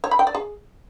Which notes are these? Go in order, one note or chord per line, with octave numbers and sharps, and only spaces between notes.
C#5
B5
G5
D5
G#4